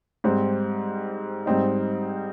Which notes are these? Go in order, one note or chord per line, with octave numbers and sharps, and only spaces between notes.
G#2 G3 C4
G#2 G3 C4 D#4